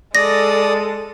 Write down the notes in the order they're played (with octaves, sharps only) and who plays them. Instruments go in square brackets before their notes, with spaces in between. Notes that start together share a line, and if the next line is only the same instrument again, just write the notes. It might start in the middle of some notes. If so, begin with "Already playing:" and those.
[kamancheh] G#3 A4 [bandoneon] D5 D#6 [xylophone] A#6